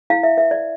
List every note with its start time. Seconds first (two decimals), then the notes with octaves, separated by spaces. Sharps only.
0.10 E4 F5
0.23 E5
0.37 B4 E5
0.51 D5